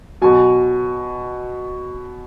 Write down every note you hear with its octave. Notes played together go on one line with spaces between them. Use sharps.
B2 F#3 G#5